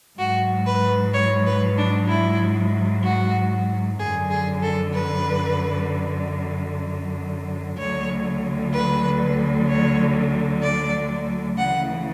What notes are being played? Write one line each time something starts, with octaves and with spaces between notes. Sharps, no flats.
G#2 F#3 F#4
B4
C#5
B4
D4
E4
F#4
F#2 D3 F#3 G#4
G#4
A4
B4
D2 D3 F#3 C#5
B4
C#5
D5
D2 C#3 E3 F#5